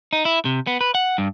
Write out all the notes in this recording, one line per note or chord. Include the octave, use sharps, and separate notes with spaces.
D#4
E4
C3
B3
B4
F#5
G2